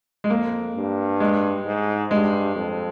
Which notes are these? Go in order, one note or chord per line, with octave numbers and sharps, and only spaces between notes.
G#3
F2 A#3
G2
G#3
G#2
G2 G#3
F2